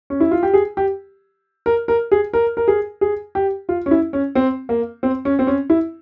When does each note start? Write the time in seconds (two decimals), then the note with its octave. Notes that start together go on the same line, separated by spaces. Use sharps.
0.10 C#4
0.20 E4
0.31 F4
0.43 G4
0.54 G#4
0.77 G4
1.66 A#4
1.88 A#4
2.12 G#4
2.34 A#4
2.57 A#4
2.68 G#4
3.01 G#4
3.35 G4
3.69 F4
3.86 C#4
3.91 E4
4.13 C#4
4.35 C4
4.69 A#3
5.03 C4
5.25 C#4
5.39 C4
5.47 C#4
5.70 E4